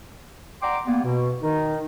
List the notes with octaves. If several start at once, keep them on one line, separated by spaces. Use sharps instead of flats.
D5 F#5 G5 A#5 C6 D6
G3 A#3 B3
B2
D#3 D#4